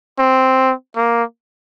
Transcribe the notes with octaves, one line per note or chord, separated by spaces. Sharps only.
C4
A#3